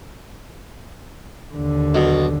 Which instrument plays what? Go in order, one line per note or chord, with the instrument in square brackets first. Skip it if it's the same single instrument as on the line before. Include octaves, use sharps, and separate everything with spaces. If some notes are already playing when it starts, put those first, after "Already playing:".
[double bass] D#2 D3
[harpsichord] B1 B2